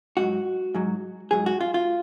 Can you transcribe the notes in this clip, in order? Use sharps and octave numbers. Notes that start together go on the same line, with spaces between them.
G#2 F#3 F#4
G#2 F#3
G#2 F#3 G#4
F#4
F4
F4